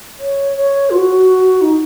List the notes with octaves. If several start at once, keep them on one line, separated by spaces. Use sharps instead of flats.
C#5
C#5
F4
F#4
D#4